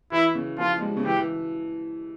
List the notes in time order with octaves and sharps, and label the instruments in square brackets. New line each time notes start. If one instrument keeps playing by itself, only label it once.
[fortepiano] E3 [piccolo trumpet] E4
[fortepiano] C#3
[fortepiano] F3 [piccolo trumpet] F4
[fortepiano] G#3
G3
C#3
[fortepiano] E3 [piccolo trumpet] G4
[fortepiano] E3